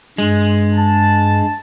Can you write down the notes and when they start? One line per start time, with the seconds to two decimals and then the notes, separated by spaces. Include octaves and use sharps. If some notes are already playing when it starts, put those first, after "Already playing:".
0.18 G2 G#3
0.73 A5